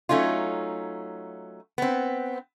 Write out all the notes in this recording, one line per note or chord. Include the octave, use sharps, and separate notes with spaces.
F#3 A3 C#4 D#4 F4
B3 C4